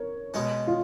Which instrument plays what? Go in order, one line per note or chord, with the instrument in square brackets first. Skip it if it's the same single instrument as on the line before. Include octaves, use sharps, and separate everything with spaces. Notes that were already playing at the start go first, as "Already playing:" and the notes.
Already playing: [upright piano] A#4 C#5
[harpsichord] B2 G#3 C#4
[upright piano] F4